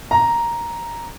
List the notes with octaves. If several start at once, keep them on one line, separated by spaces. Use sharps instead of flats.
A#5